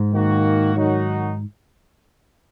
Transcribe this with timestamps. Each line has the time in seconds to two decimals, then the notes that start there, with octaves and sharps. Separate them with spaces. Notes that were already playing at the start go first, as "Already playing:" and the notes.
Already playing: G#2
0.14 D#3 A#3 F#4
0.75 D#3 F#3 D#4 F#4